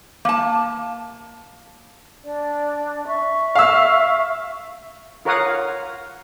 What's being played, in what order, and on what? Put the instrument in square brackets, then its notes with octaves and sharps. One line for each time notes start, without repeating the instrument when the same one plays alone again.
[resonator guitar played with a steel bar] A#3 A5
[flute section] D4 D5
E5 C#6
[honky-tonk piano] F5 E6
[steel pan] F4 A#4 C#5 F5 F#5 D#6